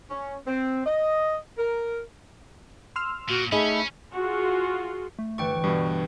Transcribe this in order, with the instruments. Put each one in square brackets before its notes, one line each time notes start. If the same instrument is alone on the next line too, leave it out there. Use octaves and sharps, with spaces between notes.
[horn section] C#4
C4
D#5
A#4
[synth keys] C6 E6 F6
[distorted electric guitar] A#2 [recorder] F#4
[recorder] A3 [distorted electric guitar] C#4 [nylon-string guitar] D#4 G#4 D#5 [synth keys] B5
[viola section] F4 F#4 G#4
[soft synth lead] A3
[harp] G1 E3 D5 [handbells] B4 G5 C#6
[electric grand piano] G2 B2 [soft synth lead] G3